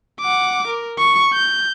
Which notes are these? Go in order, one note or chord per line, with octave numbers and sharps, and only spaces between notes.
F#5 D6
A#4
C#6
G6